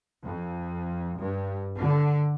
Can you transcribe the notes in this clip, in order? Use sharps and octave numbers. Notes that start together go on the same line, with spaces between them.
F2
G2
D3